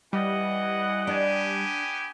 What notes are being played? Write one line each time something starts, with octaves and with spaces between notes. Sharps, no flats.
E3 G3 D#5 F#5
B3 D4 G4 G#5